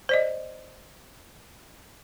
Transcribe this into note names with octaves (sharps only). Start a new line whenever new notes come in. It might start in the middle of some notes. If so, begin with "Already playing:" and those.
C5 D5 D#5